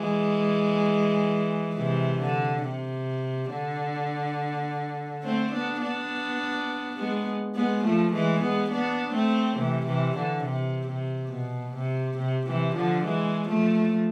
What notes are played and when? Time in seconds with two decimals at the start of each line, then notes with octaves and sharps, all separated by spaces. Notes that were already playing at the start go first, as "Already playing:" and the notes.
Already playing: E3 G#3
1.76 C3 E3
2.20 D3
2.63 C3
3.51 D3
5.23 A3 C4
5.52 B3 D4
5.81 B3 D4
6.97 G#3 B3
7.56 G#3 B3
7.84 F3 A3
8.13 E3 G#3
8.41 G#3 B3
8.71 B3 D4
9.14 A3 C4
9.57 C3 E3
9.86 C3 E3
10.15 D3
10.44 C3
10.87 C3
11.32 B2
11.75 C3
12.18 C3
12.47 C3 E3
12.76 D3 F3
13.05 E3 G#3
13.48 F3 A3